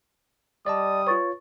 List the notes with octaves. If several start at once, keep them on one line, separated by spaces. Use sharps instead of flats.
G3 D5 D#5 A5 D#6
F4 B4 C#5 C#6 A6